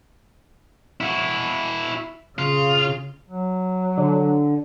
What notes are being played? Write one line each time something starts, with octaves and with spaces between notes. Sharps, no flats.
E4 F#4
C#3 F4
F#3
D3